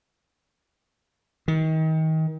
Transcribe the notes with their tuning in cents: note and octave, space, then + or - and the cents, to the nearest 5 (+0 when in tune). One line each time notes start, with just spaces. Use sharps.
D#3 +30